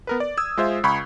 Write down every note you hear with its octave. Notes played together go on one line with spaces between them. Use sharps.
B3 A#4 B4
D5
D#6 E6 G#6
G#3 F4 C5 E5
C#2 B5 C#6 G#6